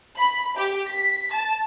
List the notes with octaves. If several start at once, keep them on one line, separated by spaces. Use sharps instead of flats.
B5
G4
B6
A5